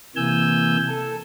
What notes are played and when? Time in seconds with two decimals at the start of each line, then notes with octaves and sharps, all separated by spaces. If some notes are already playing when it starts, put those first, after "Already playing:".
0.16 C3 E3 A#3 G#5 E6 G6
0.88 A4